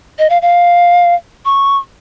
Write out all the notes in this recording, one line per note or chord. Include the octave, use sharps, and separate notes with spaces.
D#5
F5
F5
C#6